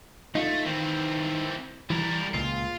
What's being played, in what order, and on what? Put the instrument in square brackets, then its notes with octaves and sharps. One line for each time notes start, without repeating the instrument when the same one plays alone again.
[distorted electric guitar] A3 [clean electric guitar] D#4 F4
[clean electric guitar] D#3 [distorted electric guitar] E3 C4
[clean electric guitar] E3 [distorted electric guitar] G3 A#4
[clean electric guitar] C#2 A#2 [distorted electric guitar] F4